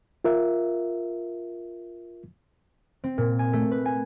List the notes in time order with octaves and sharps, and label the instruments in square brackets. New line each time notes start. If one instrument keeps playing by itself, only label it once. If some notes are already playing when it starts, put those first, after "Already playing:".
[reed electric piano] F4 A#4 E5
[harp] C4
A#2
G#5
A3
B4
G#5